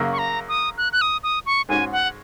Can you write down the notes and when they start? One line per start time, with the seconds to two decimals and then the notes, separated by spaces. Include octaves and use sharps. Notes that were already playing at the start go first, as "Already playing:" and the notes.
Already playing: F#2 C#3 A#3
0.12 C#6
0.18 A#5
0.48 D#6
0.78 F#6
0.93 F#6
1.01 D#6
1.23 D#6
1.46 C#6
1.69 G#2 G#3 C#4 F#4 G#5
1.92 F#5